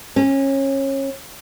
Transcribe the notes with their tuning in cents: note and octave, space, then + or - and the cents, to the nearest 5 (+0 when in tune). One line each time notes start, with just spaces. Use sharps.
C#4 -25